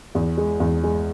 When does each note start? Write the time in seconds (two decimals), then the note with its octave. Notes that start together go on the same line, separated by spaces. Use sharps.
0.15 E2
0.37 G#3
0.60 E2
0.83 G#3